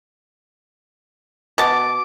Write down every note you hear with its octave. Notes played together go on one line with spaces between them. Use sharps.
B2 A5 D6